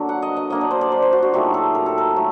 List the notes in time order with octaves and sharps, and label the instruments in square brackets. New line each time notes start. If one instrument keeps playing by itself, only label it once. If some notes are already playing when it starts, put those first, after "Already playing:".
Already playing: [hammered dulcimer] D3 F#3 A#3
F#5
D#5
D#5
F#3 A#3 D4 D#5
D5
C5
D5
C5
C5
F#4
F#4
A#2 F#3 A3 D#4 G4
A4
A#4
A4
A#4
F#3 A3